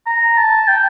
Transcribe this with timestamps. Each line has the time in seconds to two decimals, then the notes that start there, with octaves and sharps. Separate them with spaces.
0.06 A#5
0.37 A5
0.68 G5